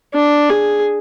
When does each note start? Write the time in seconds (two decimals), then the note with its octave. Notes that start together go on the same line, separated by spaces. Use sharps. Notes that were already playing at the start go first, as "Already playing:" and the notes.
0.15 D4
0.50 G#4